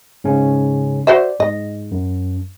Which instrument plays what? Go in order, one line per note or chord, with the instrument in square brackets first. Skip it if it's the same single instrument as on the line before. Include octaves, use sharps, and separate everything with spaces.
[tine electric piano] G#2 C#3 C#4
[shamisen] F#4 C5 E5 [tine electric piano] D5
[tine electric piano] G#2 [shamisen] D#5
[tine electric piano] F#2